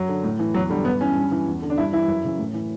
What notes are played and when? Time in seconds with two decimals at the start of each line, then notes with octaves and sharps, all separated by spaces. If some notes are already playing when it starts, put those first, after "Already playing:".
Already playing: F#2 F#3
0.09 D3
0.24 A2
0.39 E3
0.54 E2 F#3
0.70 D3 G3
0.85 G2 B3
1.01 E3 C#4
1.16 G2
1.31 E3
1.47 E2
1.62 D3
1.70 D4
1.77 G2 E4
1.93 E3 E4
2.08 F#2
2.24 C#3 E3
2.39 A2
2.54 E3